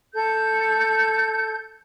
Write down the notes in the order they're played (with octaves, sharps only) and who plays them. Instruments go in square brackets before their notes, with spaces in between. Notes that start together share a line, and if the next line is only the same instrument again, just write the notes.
[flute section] A4 G6